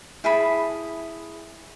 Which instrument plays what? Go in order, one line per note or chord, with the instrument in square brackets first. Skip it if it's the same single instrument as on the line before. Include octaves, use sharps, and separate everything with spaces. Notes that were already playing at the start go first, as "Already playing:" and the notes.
[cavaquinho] E4 G#4 A5 B5